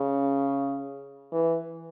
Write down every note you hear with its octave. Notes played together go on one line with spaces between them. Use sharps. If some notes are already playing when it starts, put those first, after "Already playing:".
Already playing: C#3
E3